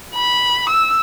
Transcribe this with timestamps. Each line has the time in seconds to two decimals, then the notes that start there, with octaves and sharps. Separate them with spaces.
0.15 B5
0.69 E6